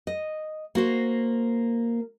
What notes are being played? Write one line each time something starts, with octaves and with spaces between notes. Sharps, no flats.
D#5
A#3 F#4 C5